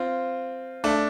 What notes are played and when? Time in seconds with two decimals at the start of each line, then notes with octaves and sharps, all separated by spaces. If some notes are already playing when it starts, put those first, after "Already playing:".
Already playing: C4 F4
0.84 A3 D4